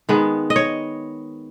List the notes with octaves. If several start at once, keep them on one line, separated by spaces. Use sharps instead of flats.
D#3 G#3 B3
D#5
C#5